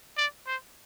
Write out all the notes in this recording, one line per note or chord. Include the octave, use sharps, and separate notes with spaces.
D5
C5